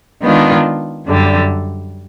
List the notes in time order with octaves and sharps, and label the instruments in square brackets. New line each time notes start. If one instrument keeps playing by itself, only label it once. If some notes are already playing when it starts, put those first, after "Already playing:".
[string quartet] D#3 G#3 B3 D4 F4
F#2 D3 G3